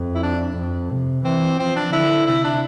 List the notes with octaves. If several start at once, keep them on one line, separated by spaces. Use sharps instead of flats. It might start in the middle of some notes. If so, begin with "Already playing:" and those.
Already playing: F2
E4
D4
F2
C3
E3 C4
F3 C4
D4
D3 E4
C3 E4
D4